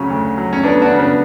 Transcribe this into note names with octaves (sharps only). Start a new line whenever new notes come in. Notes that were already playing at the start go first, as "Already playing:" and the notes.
Already playing: D2 C#3 F#3 C#4
D2
F#3
C#4
D2 B3 D4
D4 F#4
C#3 C#4
B3 D4